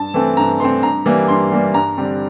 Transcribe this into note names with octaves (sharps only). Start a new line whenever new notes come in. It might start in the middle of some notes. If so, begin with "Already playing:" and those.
Already playing: G2 A5
E3 A3 C4
G2 A#5
E3 A3 C4 C6
G2 A#5
E3 G3 A#3
G2 C6
E3 G3 A#3
G2 A#5
D3 G3 C4